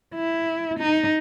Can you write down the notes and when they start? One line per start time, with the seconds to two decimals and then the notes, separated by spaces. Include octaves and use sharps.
0.15 E4
0.79 D#4